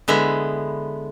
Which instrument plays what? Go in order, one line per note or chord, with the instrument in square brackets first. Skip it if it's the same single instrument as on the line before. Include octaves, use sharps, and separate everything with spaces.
[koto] D3 G#3 B3 E4